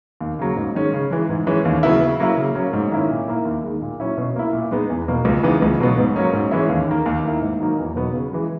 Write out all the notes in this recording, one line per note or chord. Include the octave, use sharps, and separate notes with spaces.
D#2
C#3 F#3 A#3
G#2
D#3 G#3 C#4
C#3
E3 G#3
G#2
E3 G#3 C#4
D#2
C#3 F#3 B3 E4
C#3
F#3 A#3 E4
C#3
F#3 A#3 C#4
G#2
D#3 A#3 C#4 E4
A#2
A#3 E4
D#2
D#3 G#3
A#2
F#3 C#4 E4
B2
A#3 E4
A#2
G#3 B3 D#4
E2
B2 A#3
C#2
C#3 E3 B3 D#4
C#2
B2 F#3 B3
G#2
F#3 A#3 C#4
G#2
E3 G#3 C#4 E4
D#2
D#3 A#3
D#2
D#3 A#3 E4
G#2
D#3 F#3 A#3 D#4
E2
B2 F#3 B3
C#3
E3 G#3